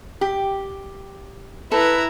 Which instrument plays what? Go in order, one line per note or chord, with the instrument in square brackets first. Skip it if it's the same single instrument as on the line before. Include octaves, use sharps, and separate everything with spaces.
[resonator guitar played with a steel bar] G4
[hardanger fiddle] E4 A#5 [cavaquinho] A4 [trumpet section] B4